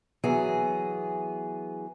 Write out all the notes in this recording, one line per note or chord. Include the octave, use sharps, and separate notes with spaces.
E3 F#3 B3 G#4